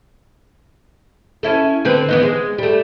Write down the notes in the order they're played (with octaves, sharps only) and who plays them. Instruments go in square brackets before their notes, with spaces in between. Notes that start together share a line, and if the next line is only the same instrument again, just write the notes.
[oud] C#4 E4 A4
D3 C4 B4
E3 B3 D#4
G#3
G3 A3